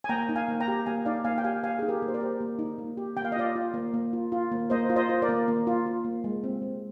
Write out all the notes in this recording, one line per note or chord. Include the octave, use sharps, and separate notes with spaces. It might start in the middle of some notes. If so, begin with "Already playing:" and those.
G#5
A#3 G5 A#5
D#4
F5 G#5
A#3
G5 A#5
G4
A#3 F5 G#5
D#4 D5 F5
A#3 F5 G#5
G5
G4 F5 G#5
A#3 F5 G#5
D#4 G#4
G4 A#4
A#3
C5
A#4 D5
G4
A#3
D#4
A#3
G4
A#3 G5
F5
D#5
F4 D5 F5
F4
A#3
A#3
F4
F4
A#3
A#3 C5 D#5
F4
C5 D#5
F4
A#4 D5
A#3
A#3
F4
F4
A#3
G#3
C4
G#3